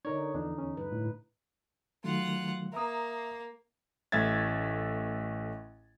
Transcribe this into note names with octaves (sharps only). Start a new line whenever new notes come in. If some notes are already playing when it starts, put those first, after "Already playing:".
D3 D#4 A#4 C#5 D5
E2 E3 F3 D4
C#4
G2 B4
A2
D#3 F#3 A3 F4 F#5
A#3 E5 A#5 D#6
A1 A3 E5 G#6 A6